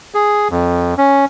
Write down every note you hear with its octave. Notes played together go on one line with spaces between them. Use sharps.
G#4
F2
C#4